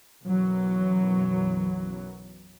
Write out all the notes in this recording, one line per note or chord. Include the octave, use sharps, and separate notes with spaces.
B1 F#2 E3 F#3